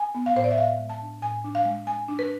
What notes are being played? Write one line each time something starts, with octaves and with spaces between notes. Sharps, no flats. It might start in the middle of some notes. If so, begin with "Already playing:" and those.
Already playing: G#5
B3
F5
A2 C5
D5
E5
A2 F5
G#3
A5
D4
A2 G#5
D4
F5
G#3
G#3 G#5
D4
B4